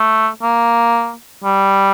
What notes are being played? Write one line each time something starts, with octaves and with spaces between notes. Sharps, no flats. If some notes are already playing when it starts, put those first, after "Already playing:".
Already playing: A3
A#3
G3